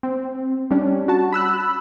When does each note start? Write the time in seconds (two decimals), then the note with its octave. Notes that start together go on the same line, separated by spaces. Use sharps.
0.03 C4
0.71 G3 C#4 D4
1.08 F#4 A5
1.32 B5 E6 F#6